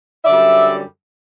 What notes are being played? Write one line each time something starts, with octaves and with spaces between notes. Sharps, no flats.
F#2 D3 G3 D5 E5